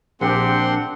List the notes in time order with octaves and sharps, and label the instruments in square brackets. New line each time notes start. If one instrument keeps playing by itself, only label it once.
[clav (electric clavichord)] A#1 [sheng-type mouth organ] C4 F#5 C6 [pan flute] D4 [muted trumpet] G4